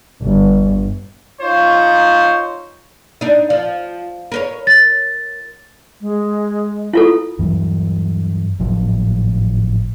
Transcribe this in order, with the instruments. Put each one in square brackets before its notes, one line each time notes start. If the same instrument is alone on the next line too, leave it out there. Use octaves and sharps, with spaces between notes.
[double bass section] G1
[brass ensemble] D#4 F4 C5 C#5
[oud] D4 D#4
F3
A#4 B4 C#5
[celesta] A6
[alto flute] G#3
[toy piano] E4 F4 A4
[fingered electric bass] G2 E3 F#3
G#1 A2 F3 F#3